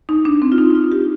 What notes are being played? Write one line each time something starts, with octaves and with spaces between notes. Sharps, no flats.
D#4
D4
C4
F4
D#4
D#4
F4
G4